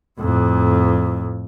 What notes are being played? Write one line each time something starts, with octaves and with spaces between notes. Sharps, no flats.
F2 A2